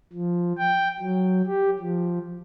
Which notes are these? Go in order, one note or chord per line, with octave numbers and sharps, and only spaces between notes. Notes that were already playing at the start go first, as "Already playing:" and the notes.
F3
G5
F#3
G4
F3